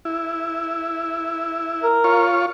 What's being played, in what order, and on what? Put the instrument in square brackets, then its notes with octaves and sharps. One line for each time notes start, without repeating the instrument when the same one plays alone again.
[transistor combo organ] E4
[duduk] A#4
[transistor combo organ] F4 C#5